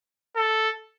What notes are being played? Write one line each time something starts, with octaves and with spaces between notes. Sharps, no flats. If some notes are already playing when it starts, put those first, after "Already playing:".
A4